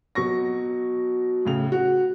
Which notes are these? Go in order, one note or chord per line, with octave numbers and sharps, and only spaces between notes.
B2 F#3 C#6 A#6
A2 C#3 F7
F#4